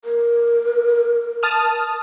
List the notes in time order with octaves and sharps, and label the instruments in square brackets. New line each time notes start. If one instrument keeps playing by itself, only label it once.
[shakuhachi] A#4
[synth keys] A5 D#6 F6